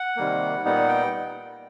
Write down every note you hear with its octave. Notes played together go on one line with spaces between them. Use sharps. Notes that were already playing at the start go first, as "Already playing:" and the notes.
Already playing: F#5
C3 D#3 G3 A#3
A#2 G3 B3 D#4 F#5
G5